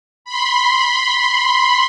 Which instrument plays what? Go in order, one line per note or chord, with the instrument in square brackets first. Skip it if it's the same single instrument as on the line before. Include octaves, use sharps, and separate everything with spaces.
[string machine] B5 C6